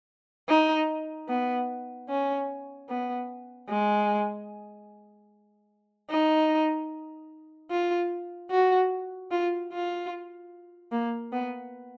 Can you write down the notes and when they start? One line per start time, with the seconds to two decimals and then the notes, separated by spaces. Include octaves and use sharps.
0.49 D#4
1.28 B3
2.09 C#4
2.89 B3
3.69 G#3
6.10 D#4
7.70 F4
8.50 F#4
9.31 F4
9.72 F4
10.92 A#3
11.32 B3